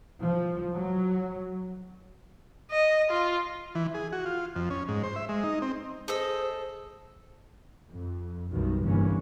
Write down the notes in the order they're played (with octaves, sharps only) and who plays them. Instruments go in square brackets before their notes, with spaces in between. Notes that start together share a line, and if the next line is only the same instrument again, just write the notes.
[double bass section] F3
F#3
[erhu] D#5
F4
[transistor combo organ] E3
G#4
F#4
F4
F2
C#4
G#2
C5
E5
G#3
D#4
C4
[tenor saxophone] G#4 [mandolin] A4 D#5 E6 [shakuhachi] C5
[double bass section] F2
B1 F#2 B2 D#3 G3
G1 C2 G2 E3 A#3 C#4